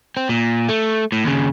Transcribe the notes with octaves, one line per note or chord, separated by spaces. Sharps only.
C4
A#2
A3
A2
D#2 C#3